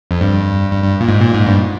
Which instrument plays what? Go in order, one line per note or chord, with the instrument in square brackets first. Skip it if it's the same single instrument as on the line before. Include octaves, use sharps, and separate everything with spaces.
[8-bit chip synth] F2
G2
G2
G2
A#2
G#2
A#2
G#2
G2